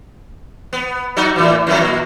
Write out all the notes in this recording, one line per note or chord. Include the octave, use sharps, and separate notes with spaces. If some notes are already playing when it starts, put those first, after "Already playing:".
B3
F#3 D#4 F#4
A2 E3
F2 E3 F#3
A#2